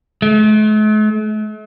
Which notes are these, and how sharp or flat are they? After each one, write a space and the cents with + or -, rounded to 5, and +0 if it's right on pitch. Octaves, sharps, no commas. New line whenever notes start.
A3 -45